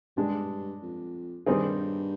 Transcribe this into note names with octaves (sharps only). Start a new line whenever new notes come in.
G2 G#3 D4 G4
F2
G2 D#3 G3 C4 D#4 G#4